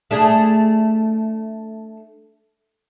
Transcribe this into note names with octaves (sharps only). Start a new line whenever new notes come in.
A3 D4 G#4